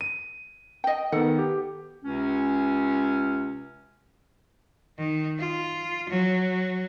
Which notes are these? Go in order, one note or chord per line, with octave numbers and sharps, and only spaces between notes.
D#7
D#5 G5
D#3 B3 A4 F#5
G4
C#2 C3 C#4
D#3
F4
F#3